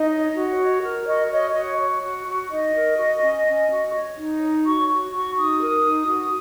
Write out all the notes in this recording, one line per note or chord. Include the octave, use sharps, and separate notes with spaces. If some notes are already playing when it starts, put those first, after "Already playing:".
Already playing: D#4 D#5
C#5
F#4
C#5
A#4
F#4 D#5
C#5 D#5
F#4 D#5
C#5
F#4
F#4
D#4 D#5
A#4
F#4
C#4
C#4
F#4
C#5
D#4
C#5
F#4 C#6
F#4
F#4 C#6
D#4 D#6
A#4
D#4
F#4